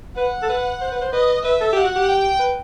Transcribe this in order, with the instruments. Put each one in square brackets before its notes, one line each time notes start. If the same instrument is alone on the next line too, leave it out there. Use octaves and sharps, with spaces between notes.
[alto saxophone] B4 [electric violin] F#5
[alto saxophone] A4
B4
C5
B4
C5
[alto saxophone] B4 [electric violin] D#5
[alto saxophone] B4 [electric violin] E5
[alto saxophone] A4
[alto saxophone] G4 [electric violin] F#5
[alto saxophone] F#4
G4
[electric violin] G5
[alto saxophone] B4